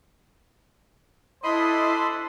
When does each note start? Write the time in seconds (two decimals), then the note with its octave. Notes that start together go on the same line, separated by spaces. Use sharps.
1.44 D4 E4 A4 C5 D#5 B5 C6